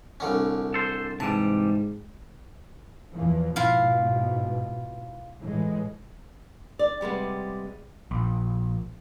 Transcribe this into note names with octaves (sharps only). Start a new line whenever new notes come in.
C2 D3 C#4
A4 C5
G#2 C3 E3 G3 A5
E2 E3 F3
G#2 B2 E4 F4 F5
A2 E3 G#3
D5
C3 G3 G#3 B3
A#1